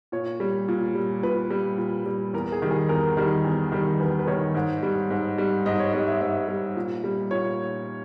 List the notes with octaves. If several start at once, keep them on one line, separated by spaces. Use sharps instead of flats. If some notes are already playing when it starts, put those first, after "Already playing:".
A#2 C#5
G3
A#2
G3
A#2 B4
G3
A#2
G3
E2 A#4
G#4
D#3 G3
G#4
E2 A#4
D#3 G3
E2
D#3 G3
E2 B4
B4
D#3 G3 C#5
G#2
G3
G#2
G3
G#2 D#5
C#5
G3 D#5
E5
G#2 E5
G3
A#2
G3
A#2 C#5